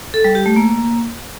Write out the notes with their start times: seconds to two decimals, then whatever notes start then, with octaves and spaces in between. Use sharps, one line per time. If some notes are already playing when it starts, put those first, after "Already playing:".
0.14 A4
0.24 G3
0.35 G4
0.46 A3
0.56 A#3